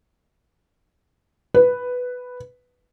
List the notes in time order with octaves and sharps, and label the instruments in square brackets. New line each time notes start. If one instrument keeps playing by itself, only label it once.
[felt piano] B4